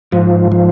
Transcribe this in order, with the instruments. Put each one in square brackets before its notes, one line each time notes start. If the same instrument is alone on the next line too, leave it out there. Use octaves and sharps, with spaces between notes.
[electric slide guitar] G#2 [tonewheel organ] F3
[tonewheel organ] F3